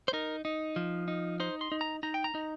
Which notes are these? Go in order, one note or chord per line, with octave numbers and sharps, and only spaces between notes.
C5
D#4 A#4
D#4
F3
D#4
D#4 C5
C6
D#4
A#5
D#4 A#5
G5
A#5
D#4